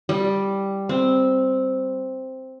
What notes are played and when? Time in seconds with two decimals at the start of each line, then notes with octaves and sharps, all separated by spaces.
0.09 G3
0.89 C4